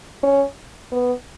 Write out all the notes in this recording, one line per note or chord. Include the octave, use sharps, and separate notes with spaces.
C#4
B3